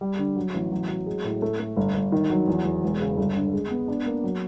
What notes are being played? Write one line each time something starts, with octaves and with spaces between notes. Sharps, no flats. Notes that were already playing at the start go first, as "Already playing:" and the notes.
G3
D3
F#3
A1
F#3
F#3
G#3
A2
A3
A3
G1
G1
D#3
F#3
E2
E2
E1
C#3
G1
D3
G#3
B3
D4
A#3
F#3